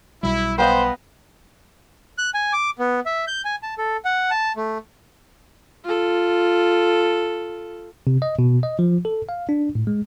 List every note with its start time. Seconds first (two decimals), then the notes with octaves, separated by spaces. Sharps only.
0.23 B1 B2 G3 E4
0.58 B3 C5 D#5 F5 G5
2.18 F#6
2.34 G#5
2.53 D6
2.79 B3
3.06 E5
3.28 G6
3.45 G#5
3.63 A5
3.78 A4
4.05 F#5
4.31 A5
4.56 A3
5.84 F4 A4
8.07 C3
8.22 D#5
8.39 B2
8.63 D#5
8.79 F3
9.05 A4
9.29 F5
9.49 D4
9.75 A2
9.87 G#3